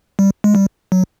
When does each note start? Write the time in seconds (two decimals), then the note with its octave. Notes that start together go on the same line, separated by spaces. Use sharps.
0.19 G3
0.44 G#3
0.55 G3
0.92 F#3